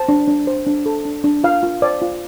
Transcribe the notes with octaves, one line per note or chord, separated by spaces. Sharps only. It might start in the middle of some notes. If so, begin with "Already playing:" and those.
Already playing: C5 A5
D4
D4
C5
D4
A4
D4
D4
F4 F5
F4
C5 D5
F4